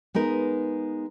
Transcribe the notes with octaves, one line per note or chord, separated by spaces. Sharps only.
G#3 B3 D#4 A#4